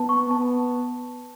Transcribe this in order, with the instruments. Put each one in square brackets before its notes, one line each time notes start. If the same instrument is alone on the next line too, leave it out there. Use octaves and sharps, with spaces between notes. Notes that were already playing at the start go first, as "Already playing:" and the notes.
Already playing: [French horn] B3 [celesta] A5
[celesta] C#6
[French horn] B3 [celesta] A5